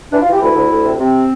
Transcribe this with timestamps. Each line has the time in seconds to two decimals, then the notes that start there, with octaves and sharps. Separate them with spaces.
0.13 E3 D4
0.22 F4
0.28 E3 G4
0.42 D2 E4
0.56 D2
0.71 D2
0.85 C3
1.00 C3 C4